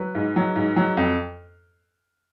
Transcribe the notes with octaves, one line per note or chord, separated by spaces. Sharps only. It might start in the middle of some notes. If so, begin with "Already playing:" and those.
Already playing: F#3 B4
G#2
F#3
G#2
F#3
F2